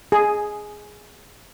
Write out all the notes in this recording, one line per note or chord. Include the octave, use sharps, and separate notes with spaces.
G#4